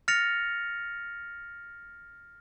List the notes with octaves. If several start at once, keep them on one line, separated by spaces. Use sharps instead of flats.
F6 A6 A#6 C#7 F7